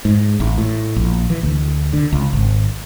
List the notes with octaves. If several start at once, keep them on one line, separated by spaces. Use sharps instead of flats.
G#2
A1
A2
A#1
E3
D2
D3
C#2
G#1